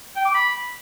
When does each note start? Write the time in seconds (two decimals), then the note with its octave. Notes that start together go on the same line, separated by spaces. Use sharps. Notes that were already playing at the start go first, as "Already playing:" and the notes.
0.16 G5
0.25 D6
0.35 B5